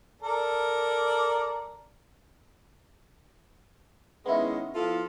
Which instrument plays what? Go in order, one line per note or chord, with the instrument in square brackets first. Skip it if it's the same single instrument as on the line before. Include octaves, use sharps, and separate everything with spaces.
[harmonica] A4 A#4 D5
[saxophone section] D#3 G#3 C#4 [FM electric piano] B3 E4
[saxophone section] F3 F4 A4